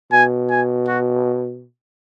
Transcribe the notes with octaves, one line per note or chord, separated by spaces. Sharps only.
B2 G#5
G#5
F#4